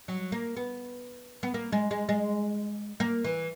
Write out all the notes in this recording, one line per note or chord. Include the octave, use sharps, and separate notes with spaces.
F#3
A#3
B3
B3
A#3
G#3
G#3
G#3
A#3
E3